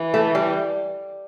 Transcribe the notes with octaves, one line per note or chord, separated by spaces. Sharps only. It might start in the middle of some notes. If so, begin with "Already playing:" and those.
Already playing: E3
A3
G3